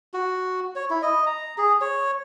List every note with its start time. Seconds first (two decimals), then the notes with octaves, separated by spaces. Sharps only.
0.14 F#4
0.76 C#5
0.90 E4
1.02 D#5
1.26 A#5
1.58 G#4
1.81 C#5